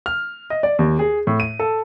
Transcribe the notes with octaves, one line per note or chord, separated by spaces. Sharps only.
F6
D#5
D5
D#2
G#4
A2
D#7
A4